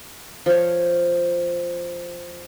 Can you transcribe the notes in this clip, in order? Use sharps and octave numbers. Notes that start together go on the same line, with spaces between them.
F3 C#5